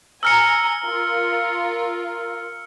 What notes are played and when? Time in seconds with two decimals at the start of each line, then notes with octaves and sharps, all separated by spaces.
0.23 G#5 A#5 E6 F6 C#7
0.85 F4 A#4